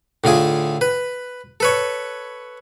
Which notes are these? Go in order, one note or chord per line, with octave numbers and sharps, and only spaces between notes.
A2 D3 F4 G#4
B4
A4 B4 C#5